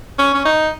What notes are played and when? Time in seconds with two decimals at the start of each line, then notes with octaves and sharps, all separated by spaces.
0.18 C#4
0.34 C#4
0.45 D#4